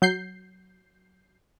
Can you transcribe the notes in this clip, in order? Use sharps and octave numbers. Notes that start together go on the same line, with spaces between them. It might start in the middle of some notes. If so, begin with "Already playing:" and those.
F#3 G6 C7